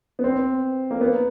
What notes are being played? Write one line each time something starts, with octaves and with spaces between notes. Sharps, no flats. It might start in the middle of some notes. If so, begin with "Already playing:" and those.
B3
C4
A#3
B3